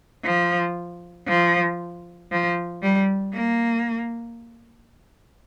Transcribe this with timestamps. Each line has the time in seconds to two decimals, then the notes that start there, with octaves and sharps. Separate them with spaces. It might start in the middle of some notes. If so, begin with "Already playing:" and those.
0.25 F3
1.28 F3
2.32 F3
2.83 G3
3.33 A#3